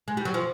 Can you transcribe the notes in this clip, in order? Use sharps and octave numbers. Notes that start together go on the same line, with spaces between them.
G#3
G3
F#3
F3